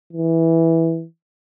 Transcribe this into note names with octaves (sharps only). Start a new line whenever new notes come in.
E3